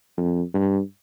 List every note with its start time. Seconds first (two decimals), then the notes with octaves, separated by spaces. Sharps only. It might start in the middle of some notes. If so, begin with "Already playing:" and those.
0.17 F2
0.54 G2